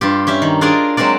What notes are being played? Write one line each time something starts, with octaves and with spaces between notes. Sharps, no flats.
G2 F4 G4
C#4 G4 E5
D#3
D4 F4 G#4 A#4 D5 D#5
F#3 G#3 C4 A#4 D5